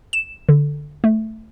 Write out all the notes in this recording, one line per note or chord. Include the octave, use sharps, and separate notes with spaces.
E7
D3
A3